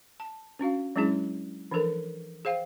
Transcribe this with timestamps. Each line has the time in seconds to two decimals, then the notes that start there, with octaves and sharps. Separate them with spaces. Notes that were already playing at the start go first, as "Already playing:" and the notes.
0.20 A5
0.59 C#4 D4 F#4 F5
0.96 F#3 G#3 C#4 D4 E4 G#4
1.71 E3 F3 D4 A4 A#4
2.45 G#4 C5 F5 G5